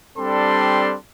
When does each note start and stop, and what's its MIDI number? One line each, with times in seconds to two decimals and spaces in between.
0.18 0.96 55
0.18 0.96 60
0.18 0.96 62
0.18 0.96 69
0.18 0.96 84